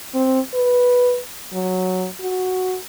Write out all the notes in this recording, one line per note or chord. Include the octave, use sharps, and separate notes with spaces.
C4
B4
F#3
F#4